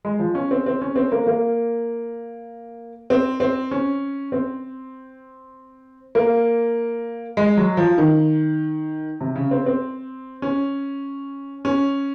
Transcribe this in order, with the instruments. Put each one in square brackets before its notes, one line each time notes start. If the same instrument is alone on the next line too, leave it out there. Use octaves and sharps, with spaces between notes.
[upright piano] G#3
F3
C#4
C4
C4
C#4
C4
A#3
A#3
C4
C4
C#4
C4
A#3
G#3
F#3
F3
D#3
C3
C#3
C4
C4
C#4
C#4